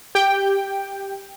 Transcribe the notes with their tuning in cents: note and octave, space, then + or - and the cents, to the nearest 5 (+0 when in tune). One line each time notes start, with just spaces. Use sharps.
G4 +5 G5 +0